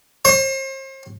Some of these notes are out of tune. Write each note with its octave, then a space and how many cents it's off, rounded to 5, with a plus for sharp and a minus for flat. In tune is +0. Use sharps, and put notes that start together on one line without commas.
C5 +40